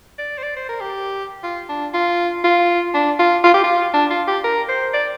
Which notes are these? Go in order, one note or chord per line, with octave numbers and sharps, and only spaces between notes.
D5
C5
D5
C5
A#4
G4
F4
D4
F4
F4
D4
F4
F4
G4
F4
D4
F4
G4
A#4
C5
D5